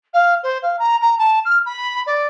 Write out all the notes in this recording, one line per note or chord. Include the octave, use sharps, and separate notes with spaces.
F5
C5
F5
A#5
A#5
A5
F6
B5
D5